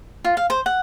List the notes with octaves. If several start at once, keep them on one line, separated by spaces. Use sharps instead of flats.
F4
F5
C5
F#5